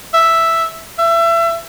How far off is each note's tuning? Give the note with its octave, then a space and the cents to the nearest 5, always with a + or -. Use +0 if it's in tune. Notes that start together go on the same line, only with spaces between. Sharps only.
E5 +0
E5 +30